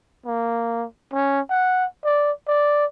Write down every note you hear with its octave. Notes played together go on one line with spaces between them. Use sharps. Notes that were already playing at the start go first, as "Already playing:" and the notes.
A#3
C#4
F#5
D5
D5